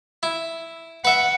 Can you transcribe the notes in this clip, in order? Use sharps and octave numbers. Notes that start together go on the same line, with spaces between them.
E4
B4 E5 F#5